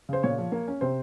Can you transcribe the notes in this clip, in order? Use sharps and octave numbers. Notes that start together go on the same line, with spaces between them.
C#3 C5
A#2 C#5
F3
A#3
C#4
C3 C5